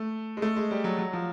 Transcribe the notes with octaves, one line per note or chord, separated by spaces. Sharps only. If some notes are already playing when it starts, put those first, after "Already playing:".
Already playing: A3
G#3
A3
G#3
G3
F#3
F#3
F3